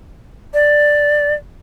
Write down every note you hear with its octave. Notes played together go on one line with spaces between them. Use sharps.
D5